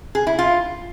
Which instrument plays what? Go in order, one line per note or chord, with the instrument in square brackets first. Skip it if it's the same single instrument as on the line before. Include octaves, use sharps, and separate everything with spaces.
[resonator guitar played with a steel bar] G#4
E4
F4